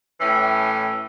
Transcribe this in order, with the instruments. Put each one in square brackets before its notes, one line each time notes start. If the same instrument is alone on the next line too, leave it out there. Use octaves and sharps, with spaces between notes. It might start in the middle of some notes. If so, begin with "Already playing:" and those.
[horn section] A2 E3 C#4 E4 G5